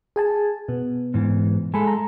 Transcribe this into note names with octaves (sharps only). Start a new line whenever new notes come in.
G#4 G#5 A5
B2 B3
G#2 E3
G#3 A4 G#5 B5
A#5